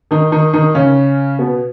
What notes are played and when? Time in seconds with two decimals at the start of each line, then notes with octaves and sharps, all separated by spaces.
0.11 D#3 D#4
0.32 D#3 D#4
0.53 D#3 D#4
0.75 C#3 C#4
1.39 B2 B3